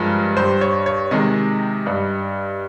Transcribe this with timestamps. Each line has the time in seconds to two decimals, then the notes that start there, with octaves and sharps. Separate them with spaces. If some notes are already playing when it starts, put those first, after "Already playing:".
Already playing: G2 F3 G#3 A#4
0.37 G2 G3 C5
0.61 C#5
0.86 C#5
1.11 C3 D#3 G#3 D#5
1.86 G2 G3